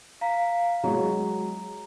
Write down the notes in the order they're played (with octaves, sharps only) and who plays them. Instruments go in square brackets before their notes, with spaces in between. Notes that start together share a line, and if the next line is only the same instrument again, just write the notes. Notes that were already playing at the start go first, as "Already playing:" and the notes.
[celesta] F5 A#5 B6
[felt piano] F#3 G#3 C#5 [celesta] A#5